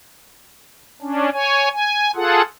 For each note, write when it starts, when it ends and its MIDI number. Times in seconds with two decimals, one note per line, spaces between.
1.02 1.30 61
1.02 1.30 62
1.33 1.69 73
1.33 1.69 80
1.73 2.11 80
2.16 2.42 65
2.16 2.42 68
2.16 2.42 69
2.16 2.42 78